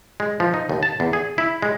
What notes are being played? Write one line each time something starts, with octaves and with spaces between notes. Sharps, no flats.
G#3
F3
D#4
D#2
A5
E2
G#4
E4
G#3